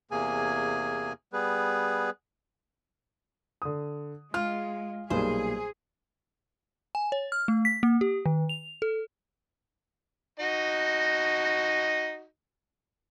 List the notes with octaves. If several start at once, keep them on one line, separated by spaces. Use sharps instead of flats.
E2 C3 A#3 G#4 G#5
G3 B3 G#4 B4
D3 D#6
G#3 F4 F6
B1 A#2 G3 G#4 C5
G#5
C#5
F6
A3
B6
A#3
G4
D#3
F7
A4
D#4 F#4 D#5